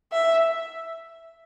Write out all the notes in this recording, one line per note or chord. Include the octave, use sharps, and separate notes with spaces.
E5